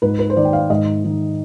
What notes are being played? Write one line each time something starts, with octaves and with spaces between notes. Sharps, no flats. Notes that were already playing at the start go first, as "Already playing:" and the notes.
G#2 B4
B4
C5
D#3 D5
G5
F5
G#2 D#5
D#3